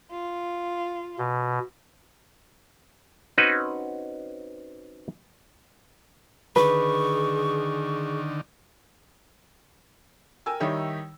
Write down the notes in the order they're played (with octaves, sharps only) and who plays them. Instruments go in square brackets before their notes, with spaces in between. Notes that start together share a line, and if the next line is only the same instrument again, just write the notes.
[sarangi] F4
[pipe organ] B2
[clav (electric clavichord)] C4 C#4 D#4 F#4 B4
[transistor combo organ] D3 D#3 [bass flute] G#4 [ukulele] B4 [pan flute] C#6
[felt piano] A#4 G5 G#5 E6
D#3 G3 D#4 E4 G4 C#5